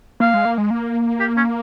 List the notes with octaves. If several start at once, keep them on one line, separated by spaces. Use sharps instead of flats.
A#3 F5
G#3
A#3
G#3
A#3
G4
C#4